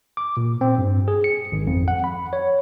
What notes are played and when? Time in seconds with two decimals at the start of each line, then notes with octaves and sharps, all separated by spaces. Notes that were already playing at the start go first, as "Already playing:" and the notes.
0.17 D6
0.37 A#2
0.61 C4
0.78 G2
1.08 G#4
1.24 C#7
1.52 G#1
1.67 F2
1.88 F#5
2.04 B5
2.33 C#5